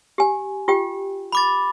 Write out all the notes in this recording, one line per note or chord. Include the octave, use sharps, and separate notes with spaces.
G4 G#5
F4 G4 G5
B5 D6 A6